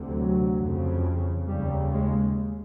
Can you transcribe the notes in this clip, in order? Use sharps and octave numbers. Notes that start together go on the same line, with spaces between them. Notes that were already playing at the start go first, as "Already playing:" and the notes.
Already playing: D2 C3
F#3
F2 C#3
D#2 C#3 G3
G#3